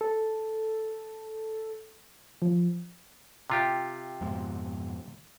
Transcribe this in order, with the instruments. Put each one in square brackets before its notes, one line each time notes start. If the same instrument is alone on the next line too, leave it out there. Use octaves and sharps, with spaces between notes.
[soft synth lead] A4
F3
[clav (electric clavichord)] C3 F4 G4
[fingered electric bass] F2 G#2 B2